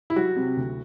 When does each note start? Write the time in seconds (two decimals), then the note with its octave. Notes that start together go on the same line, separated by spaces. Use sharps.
0.10 E4
0.16 F#3 F#4
0.36 C3
0.57 D2